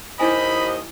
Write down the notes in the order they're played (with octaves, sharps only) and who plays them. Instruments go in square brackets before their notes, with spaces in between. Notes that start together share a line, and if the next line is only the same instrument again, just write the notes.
[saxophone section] D#2 D#5 [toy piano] D#4 E4 G#5 [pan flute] C5 [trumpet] B5